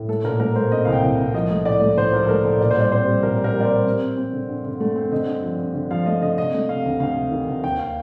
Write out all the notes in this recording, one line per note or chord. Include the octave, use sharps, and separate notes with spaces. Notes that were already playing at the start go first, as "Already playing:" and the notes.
Already playing: A2
A3 A4
A#2 A#4
A3 A#4
A3 C5
C4 D#5
C2 F5
G5
C2
C2
F3 D#5
A3
A2 D5
A3
A2 C5
F3 A#4
A4
A3 A#4
A2 C5
A#2 D5
C5
G3 D5
C4 C5
G3
A#2 A#4
A#2
A#4
G3
D5
C5
G3
C4
C4
C4
D3
G2
D3
A3
C4
D3 D#5
G2
F3
G2
D3
F3 F5
A3 D#5
D3 D#5
C3 D#5
A3
C3 F5
D2
D2 F5
C3
D#3
D2
D#2 G5
F5